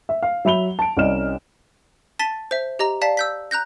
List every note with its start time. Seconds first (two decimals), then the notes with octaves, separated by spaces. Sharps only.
0.09 E5
0.22 F5
0.45 F#3 E5 B5 F7 G7
0.79 A5 D7
0.97 C2 C#4 D5 D#5 F6 E7
2.19 A5 A6 B6 D#7 G7
2.51 C5 E5
2.79 G4 D#5 A#5
3.01 D5 F5 A5 B6
3.17 E6 G6 B6
3.51 A#5 F#6 G6 A#6